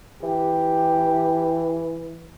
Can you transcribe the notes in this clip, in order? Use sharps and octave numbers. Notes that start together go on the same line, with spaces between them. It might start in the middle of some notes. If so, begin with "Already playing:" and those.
E3 G4